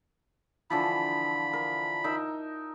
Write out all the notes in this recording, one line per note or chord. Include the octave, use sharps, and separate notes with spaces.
D3 E3 F3 B5
A#4
D#4 A#4 E5